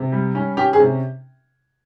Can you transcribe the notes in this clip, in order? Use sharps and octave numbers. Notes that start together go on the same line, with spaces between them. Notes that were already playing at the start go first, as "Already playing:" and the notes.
Already playing: C3
G3
C#4
C#4 G4
G#4
C3